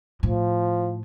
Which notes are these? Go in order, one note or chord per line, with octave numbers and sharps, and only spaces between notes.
A2 F3